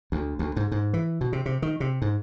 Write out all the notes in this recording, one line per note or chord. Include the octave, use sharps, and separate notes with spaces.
D2
D2
G#2
G#2
E3
B2
C3
C3
D#3
C3
G#2